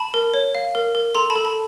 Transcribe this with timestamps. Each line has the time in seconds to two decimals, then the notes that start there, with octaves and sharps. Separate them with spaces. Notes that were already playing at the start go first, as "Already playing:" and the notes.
Already playing: A5 B5
0.14 A#4
0.34 C#5
0.55 F5
0.75 A#4
0.95 A#4
1.15 A4 A#5 C6
1.30 A5 B5
1.36 A4
1.45 A5 B5